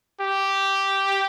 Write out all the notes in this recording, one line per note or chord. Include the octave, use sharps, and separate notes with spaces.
G4